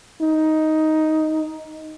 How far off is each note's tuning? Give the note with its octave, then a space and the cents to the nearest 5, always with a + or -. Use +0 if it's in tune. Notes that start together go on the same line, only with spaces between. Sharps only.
D#4 +10